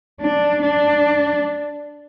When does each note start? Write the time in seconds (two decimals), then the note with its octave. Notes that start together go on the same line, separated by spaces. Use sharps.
0.21 D4
0.62 D4